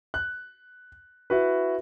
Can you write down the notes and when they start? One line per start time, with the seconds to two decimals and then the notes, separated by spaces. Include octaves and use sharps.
0.14 F#6
1.30 E4 F#4 B4